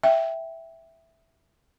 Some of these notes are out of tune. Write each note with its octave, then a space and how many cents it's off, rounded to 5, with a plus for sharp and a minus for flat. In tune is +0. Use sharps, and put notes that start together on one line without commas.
E5 +0 G5 +0